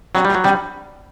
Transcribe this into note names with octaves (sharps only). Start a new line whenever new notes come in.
B2 F#3
G3
A2
F#3
B2 G3